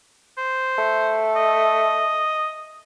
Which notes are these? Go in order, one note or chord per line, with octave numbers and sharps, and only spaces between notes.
C5
A3
D#5